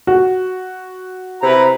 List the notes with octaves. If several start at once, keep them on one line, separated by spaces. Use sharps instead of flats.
F#4
C3 E4 B4 A#5